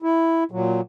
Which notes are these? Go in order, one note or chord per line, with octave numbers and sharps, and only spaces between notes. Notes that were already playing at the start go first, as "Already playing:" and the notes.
E4
A#2 F#3